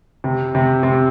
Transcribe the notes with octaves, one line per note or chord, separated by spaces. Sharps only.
C3
C3
C3